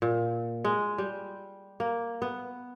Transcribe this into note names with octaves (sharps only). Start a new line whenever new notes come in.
A#2
G#3
G3
A#3
B3